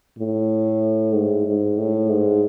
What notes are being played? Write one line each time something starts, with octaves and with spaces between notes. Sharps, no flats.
A2
G#2
G#2
A2
G#2